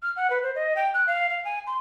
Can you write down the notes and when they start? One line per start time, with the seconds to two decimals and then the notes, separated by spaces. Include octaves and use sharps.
0.02 F6
0.16 F#5
0.30 B4
0.43 C5
0.55 D#5
0.76 G5
0.94 F#6
1.07 F5
1.30 F5
1.45 G#5
1.67 C6